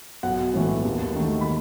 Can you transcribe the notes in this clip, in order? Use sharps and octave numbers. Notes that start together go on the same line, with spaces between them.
B1 F#5
A2 E3 A3
D#2
D#3 A3
B5